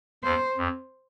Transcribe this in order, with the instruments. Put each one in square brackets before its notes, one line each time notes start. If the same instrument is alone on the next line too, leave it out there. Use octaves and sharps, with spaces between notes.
[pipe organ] E2 [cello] C5
[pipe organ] F2